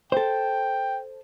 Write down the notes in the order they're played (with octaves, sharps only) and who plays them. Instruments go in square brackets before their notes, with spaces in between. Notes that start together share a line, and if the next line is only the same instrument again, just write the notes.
[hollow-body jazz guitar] A4 C5 [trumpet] G5